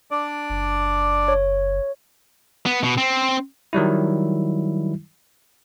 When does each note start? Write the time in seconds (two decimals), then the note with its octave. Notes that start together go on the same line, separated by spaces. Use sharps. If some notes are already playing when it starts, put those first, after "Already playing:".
0.11 D4 D5
0.50 F#1
1.28 C#5
2.66 B3
2.84 B2
2.98 C4
3.73 D#3 F#3 G3 E4